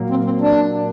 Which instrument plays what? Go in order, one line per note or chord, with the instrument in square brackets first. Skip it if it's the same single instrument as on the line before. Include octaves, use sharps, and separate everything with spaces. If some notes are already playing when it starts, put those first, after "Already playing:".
Already playing: [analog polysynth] A#2 F#3 A#3
[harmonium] C4
C4
D4